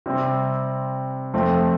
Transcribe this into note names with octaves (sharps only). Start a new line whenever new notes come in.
C3 G3 C4
F2 F3 A3 C4